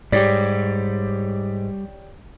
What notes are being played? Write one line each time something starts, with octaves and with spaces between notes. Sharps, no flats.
G#2 G3 G4 C#5 D5